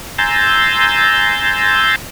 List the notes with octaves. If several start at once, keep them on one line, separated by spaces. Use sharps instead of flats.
G#5 A#5 C6 E6 G6 A6